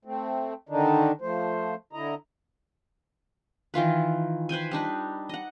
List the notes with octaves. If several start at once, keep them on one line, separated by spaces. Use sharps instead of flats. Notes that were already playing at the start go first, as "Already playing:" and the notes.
A3 C4
D3 D#3 D4 D#4
F3 A3 C5
D3 E4 D#5 A#5
D#3 E3 F4 B4
B4 C5 G5 G#5
G3 D4 D#4 B4
D#5 F#5